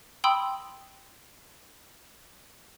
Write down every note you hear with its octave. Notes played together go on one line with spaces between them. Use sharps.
G5 B5 C6 D#6 E6